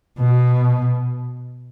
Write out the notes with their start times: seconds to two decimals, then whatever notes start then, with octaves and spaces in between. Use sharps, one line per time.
0.19 B2